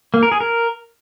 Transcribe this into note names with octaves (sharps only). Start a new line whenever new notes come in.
A#3
A#4
G#4
A#4